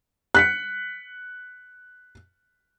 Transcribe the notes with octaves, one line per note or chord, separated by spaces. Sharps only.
F#6 B6 C#7